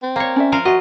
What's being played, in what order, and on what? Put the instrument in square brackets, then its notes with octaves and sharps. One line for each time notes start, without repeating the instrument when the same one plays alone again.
[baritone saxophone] C4
[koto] A#3 C#5 [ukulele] D5 F5
[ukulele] C#4 D5 E5
[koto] F3 A#4 F5
[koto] F4 D#5 [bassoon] F#4 [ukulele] E5